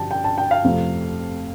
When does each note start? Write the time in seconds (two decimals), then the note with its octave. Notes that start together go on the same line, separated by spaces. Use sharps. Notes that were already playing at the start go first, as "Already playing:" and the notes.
Already playing: G2 D3 F3 G5 A5
0.11 G5
0.24 A5
0.38 G5
0.51 F5
0.64 F2 C3 F3 A3